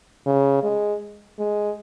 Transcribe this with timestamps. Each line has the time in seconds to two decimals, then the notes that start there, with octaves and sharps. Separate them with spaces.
0.26 C#3
0.63 G#3
1.39 G#3